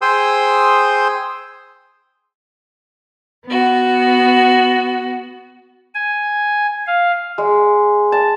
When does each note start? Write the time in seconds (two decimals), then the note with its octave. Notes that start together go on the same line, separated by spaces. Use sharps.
0.02 G#4 C5 G5 C6 D#6 E6
3.45 B3 F#4
5.95 G#5
6.87 F5
7.38 G#3
8.12 A5